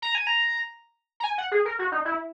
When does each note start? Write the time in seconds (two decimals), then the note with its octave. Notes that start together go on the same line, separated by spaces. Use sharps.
0.02 A#5
0.15 G#5
0.27 A#5
1.20 A#5
1.24 G#5
1.38 F#5
1.52 G#4
1.65 A#4
1.79 F#4
1.92 D#4
2.05 E4